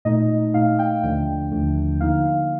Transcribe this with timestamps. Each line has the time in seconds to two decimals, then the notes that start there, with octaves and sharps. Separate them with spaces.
0.05 A#2 A3 D#4 D#5
0.54 A#2 A3 D#4 F5
0.79 G5
1.03 D#2 D3 F3 A3 D4 G5
1.51 D#2 D3 F3 A3 D4
2.00 D3 F3 A#3 D#4 F5